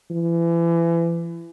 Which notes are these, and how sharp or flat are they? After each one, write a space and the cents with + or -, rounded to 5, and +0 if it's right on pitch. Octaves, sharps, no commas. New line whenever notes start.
E3 +30